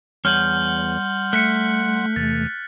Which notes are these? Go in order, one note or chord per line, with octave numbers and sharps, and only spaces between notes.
E2 G3 C#5 F#5 C6 F6 G6 F#7
A3 F#6 B6 C#7
E2 C3 E3 A6